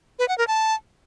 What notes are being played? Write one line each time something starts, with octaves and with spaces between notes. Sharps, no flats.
B4
F#5
A#4
A5